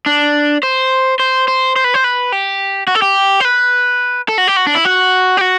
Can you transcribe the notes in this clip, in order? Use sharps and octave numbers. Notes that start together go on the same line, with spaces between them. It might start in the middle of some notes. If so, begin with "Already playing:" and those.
D4
C5
C5
C5
C5
B4
C5
B4
G4
F#4
A4
G4
C5
B4
A4
F#4
G4
F#4
D4
E4
F#4
G4
F#4